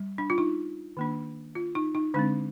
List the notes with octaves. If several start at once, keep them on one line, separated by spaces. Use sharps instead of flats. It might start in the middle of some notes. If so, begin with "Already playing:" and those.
Already playing: G3
D4
F4
D#4
D#3 A#3 D4
F4
D#4
D#4
D3 G#3 C4 D4